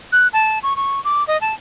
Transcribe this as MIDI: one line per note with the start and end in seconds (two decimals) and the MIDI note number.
0.12 0.28 90
0.33 0.59 81
0.63 0.76 85
0.76 1.03 85
1.04 1.26 86
1.27 1.40 75
1.41 1.54 81